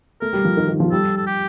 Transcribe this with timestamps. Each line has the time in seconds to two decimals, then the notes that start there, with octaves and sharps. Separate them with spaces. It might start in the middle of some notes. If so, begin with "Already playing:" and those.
0.21 A3 A#4
0.33 G3
0.45 F3
0.57 D#3
0.69 D#3
0.80 F3
0.92 G3 A4
1.17 A4
1.26 G4